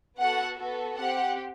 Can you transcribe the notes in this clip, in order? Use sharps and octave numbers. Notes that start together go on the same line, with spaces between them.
B3 F#4 A4 F#5
B3 F#4 A4
C4 G4 F#5